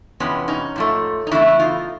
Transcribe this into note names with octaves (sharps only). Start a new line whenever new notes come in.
F2 C3 E3 B3 C#4
C#4 D#4
G#2 F3 A3
D#4
E2 C#3 A3 D4 E4
D#4 F4